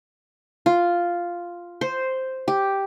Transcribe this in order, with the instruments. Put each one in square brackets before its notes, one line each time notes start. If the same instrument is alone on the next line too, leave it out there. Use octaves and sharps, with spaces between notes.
[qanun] F4
C5
G4